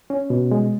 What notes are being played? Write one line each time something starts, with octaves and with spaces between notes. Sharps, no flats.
C#4
B2
G#3